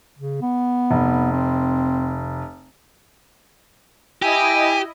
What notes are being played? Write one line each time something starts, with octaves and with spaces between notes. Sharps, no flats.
C#3
B3
F1
C4
E4 G4 D#5 G#5